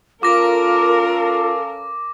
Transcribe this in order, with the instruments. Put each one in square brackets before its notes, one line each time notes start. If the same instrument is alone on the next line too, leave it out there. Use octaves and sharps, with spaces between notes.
[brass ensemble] C#4 A4 F5 [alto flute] F4 [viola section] A#4 [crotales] D6 A#6